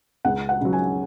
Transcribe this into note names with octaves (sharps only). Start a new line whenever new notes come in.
C#2 F#5
F#5
C#3 F#3
G#5